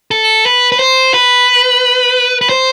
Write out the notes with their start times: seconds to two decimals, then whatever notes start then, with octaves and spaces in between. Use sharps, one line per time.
0.11 A4
0.46 B4
0.72 B4
0.79 C5
1.14 B4
2.41 B4
2.49 C5